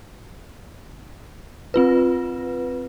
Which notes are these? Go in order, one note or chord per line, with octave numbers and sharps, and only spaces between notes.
C4 F4 B4